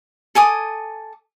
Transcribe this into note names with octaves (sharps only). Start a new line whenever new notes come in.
A4 G#5 D6 D#6